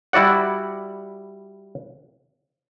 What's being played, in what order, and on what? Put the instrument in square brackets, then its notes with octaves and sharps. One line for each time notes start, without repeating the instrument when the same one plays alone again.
[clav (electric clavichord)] G3 E4 F#4 D5 F#5